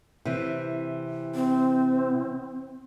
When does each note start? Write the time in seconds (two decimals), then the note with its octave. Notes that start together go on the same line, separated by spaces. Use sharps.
0.25 C3 E3
1.35 C4